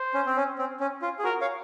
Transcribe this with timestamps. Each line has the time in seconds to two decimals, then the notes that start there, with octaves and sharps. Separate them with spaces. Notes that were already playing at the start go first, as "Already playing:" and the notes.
Already playing: C5
0.14 C#4
0.26 C4
0.37 C#4
0.59 C4
0.80 C#4
1.02 F4
1.19 G#4
1.24 F#4 A#4
1.41 C#5 F5